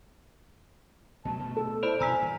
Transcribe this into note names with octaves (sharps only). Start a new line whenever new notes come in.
B2 F#3 A3 A5
B2 A3
A4
E4 C5 D5 B5
B2 G#5 A#5 E6 B6
G2 A#2 E3